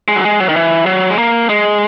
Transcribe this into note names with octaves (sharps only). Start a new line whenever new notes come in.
G#3
F#3
G#3
F#3
D#3
E3
F#3
G#3
A#3
G#3